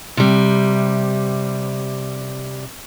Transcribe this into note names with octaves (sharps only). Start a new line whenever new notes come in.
C3 G3